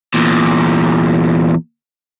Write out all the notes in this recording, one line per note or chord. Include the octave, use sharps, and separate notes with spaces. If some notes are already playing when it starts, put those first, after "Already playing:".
E2 A#2